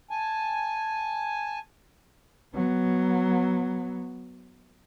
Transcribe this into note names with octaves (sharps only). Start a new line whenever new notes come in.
G#5 A5
F#3 B3